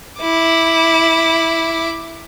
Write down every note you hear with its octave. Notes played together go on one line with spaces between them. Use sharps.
E4 D6